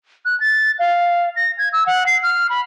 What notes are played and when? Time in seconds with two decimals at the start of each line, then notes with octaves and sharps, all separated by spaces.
0.25 F#6
0.40 A6
0.79 F5
1.36 A#6
1.58 G#6
1.73 E6
1.86 F#5
2.07 C7
2.23 F6
2.50 B5